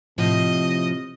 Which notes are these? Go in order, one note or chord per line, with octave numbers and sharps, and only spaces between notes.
A2 C3 F3 D#5